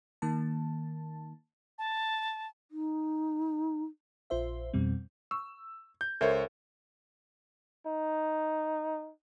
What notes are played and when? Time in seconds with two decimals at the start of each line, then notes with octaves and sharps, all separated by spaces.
0.22 D#3 A#3 A5
1.78 A5
2.71 D#4
4.30 A#1 F4 C5 E5
4.73 F2 B2 G3 C4
5.31 C#6 E6
6.01 G6
6.21 C#2 A4 A#4 C5 C#5 E5
7.86 D#4